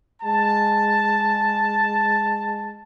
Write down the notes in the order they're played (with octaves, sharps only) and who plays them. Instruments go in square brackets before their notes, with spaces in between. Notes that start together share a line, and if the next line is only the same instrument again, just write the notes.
[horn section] G#3 A5